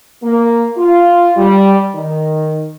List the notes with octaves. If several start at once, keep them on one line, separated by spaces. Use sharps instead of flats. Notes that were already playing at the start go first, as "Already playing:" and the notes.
A#3
F4
G3
D#3